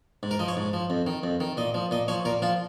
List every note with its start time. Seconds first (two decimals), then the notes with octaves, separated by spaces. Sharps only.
0.23 G#2
0.31 A#4
0.39 F3 D#5
0.48 C#5
0.57 G#2
0.73 F3
0.90 F2
1.07 D#3
1.23 F2
1.40 D#3
1.57 A#2 D#5
1.74 F3
1.91 A#2 D#5
2.08 F3 C#5
2.25 A#2 A#4
2.42 F3 F4